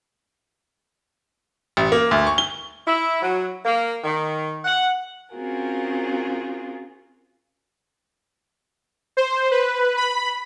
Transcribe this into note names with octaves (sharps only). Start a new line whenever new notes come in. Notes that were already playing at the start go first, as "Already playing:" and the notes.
A1
A#3
D2
C#6
G7
E4
F#3
A#3
D#3
F#5
C4 C#4 F4 F#4 G#4 A#4
C5
B4
B5